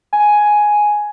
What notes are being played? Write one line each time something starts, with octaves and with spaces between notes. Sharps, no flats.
G#5